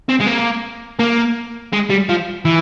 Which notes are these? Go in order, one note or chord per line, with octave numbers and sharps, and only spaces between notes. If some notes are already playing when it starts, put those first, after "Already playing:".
C4
G#3
A#3
A#3
G#3
G3
F3
E3